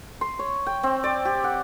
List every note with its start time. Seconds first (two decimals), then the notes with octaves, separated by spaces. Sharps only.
0.21 C6
0.39 C#5
0.66 G5
0.83 C4
1.04 D5
1.25 G4
1.44 F#5